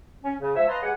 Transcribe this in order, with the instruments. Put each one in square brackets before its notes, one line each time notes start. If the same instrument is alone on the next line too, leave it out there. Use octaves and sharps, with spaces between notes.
[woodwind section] C#4
C#3
F3 G#3 C#5 E5
B4 D#5 F5 A5 A#5 C6
G#3 G4 B4 C#5 F#5